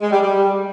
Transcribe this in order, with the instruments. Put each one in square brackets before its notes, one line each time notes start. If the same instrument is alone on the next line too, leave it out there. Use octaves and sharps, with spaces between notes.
[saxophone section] G#3
G3
G3